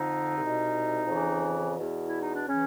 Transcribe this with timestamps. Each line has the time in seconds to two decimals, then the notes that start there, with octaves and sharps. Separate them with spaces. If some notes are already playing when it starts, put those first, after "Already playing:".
Already playing: F2 D3 D#4
0.37 C2 B2
1.07 F2 C#3 E3
1.77 E2 B2
2.06 E4
2.20 D#4
2.34 D4
2.47 C#3 E3 C#4